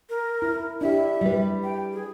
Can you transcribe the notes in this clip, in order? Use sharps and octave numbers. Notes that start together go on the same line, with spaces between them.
A#4
E4
D4 E4 G4 E5
G3 B4
G5
G#4